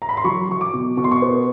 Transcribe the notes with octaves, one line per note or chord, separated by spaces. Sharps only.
A#5
B5
C6
F#3 C#6
F#3 C#6
D6
B2
B2 C#6
C6
C#6
B3